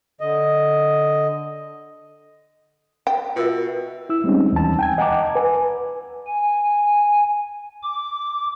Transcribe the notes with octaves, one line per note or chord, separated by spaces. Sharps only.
D3 D#5
G5
B2 F4 A#4 E5
E4 E6
G3 G#3 C4 C#4 D#4
D#2 E3 A5
G5 G#5 G#6
D#5 F#5 G5 A5 A#5 D6
B4 G#5
G#5
D6